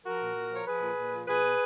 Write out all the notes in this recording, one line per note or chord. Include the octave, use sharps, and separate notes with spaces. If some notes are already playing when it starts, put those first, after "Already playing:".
F3 F#4 A#4
A#2
A#2
F3 C#5
F3 G#4 B4
A#2
A#2
F3
B2 G#4 B4
B2